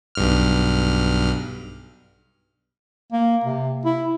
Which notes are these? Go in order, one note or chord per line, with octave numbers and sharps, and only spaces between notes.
B1 G2 F6
A#3
C3
E4